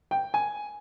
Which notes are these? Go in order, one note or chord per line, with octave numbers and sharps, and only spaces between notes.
G5
G#5